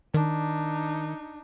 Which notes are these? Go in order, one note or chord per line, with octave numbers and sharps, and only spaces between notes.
D#3 D4 D#4